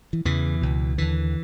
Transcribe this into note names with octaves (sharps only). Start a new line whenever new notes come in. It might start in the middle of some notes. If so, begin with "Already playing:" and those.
E3
E2 C#3 E3
C#2 B2
D#2 D3 E3